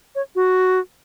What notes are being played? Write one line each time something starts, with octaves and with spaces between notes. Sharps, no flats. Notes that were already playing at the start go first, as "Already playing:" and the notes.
C#5
F#4